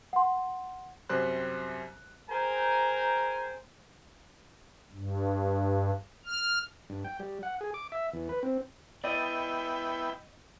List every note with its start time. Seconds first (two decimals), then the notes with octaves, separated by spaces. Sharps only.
0.13 F#5 C6
1.09 F#2 C3 G3 C5 C6 F#6
2.30 G#4 A#4 C5 G5 G#5 A#5
4.92 G2
6.26 F6
6.90 G2
7.05 G5
7.19 G3
7.43 F#5
7.61 G#4
7.74 D6
7.92 E5
8.13 E2
8.29 B4
8.43 C4
9.04 B3 E4 D5 D#5 G5